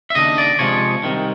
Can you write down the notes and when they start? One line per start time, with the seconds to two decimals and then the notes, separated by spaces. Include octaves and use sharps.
0.10 E5
0.15 D#2 C#3 D4 D#5
0.38 D5
0.59 C3 F3 G#3 C#5
1.03 C2 C3 D#3